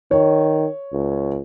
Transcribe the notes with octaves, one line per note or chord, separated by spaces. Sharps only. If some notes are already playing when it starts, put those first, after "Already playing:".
D#3 C#5
C#2